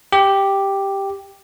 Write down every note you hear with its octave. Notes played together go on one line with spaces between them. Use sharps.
G4